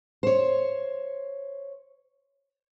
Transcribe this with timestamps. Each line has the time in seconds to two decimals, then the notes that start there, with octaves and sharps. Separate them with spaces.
0.23 C5 C#5